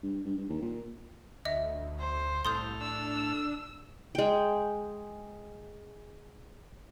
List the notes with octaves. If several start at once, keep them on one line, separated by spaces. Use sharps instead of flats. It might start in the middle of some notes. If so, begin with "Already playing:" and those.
G2
G2
G2
D#2
A#2
D2 D#5 E5
C5
C2 A2 A4 C6 D#6 F6 G6
D4 E6
G#3 G5